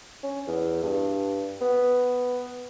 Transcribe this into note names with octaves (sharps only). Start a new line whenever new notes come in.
C#4
E2
G2
B3